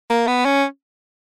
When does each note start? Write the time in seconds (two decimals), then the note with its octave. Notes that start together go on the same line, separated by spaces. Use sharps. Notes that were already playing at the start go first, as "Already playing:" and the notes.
0.10 A#3
0.27 B3
0.45 C#4